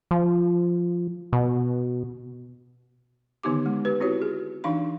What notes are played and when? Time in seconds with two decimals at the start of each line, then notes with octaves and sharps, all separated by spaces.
0.11 F3
1.33 B2
3.43 D3 D#3 B3 D#4 G4 D6
3.66 G#3
3.85 G4 B4
4.00 C4 E4 F#4 G4 C#5
4.22 G#4
4.64 E3 D4 D#4 F5 B5